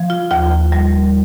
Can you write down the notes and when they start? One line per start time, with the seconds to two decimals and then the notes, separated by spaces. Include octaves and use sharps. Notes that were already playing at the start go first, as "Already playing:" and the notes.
Already playing: F3
0.10 F4
0.31 D#2 F4
0.72 G3